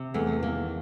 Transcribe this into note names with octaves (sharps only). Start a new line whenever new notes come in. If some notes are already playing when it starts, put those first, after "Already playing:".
Already playing: C3
E2 A3
D#3 A#3